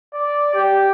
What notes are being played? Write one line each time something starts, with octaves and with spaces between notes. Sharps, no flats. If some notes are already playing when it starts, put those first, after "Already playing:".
D5
G4